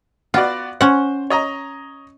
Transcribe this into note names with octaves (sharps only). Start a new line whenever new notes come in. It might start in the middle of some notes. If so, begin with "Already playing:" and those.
B3 F4 F#4 D5
C#4 C5 F#5
C#5 D#5 A#5